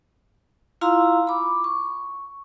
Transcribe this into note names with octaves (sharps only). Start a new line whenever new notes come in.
E4 F4 F5 A#5 C6 E6
B5 D6
C#6